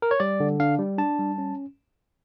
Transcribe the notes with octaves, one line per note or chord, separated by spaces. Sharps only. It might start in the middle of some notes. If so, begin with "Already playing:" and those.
A#4
C#5
G3 D5
D3
D4 F5
G3
D4 A5
G3
C#4